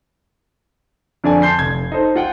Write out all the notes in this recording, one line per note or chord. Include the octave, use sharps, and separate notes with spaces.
F2 D3 D5 G#5
A5 C6 G6 C7
F1 G#6
D#4 A4 C5
F4 F#5 G5